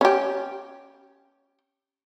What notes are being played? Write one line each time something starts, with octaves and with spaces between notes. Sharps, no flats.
C#4 G4